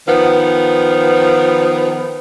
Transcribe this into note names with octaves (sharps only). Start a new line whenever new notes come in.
D#3 F3 B3